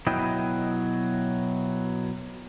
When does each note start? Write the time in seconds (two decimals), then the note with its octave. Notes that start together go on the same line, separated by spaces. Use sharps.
0.07 B2 F#3 E4 D#5 G5